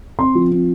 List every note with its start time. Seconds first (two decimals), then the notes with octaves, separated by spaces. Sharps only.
0.19 C4 C6
0.35 F3
0.51 C4